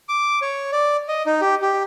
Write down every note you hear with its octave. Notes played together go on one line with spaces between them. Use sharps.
D6
C#5
D5
D#5
D#4
G4
G4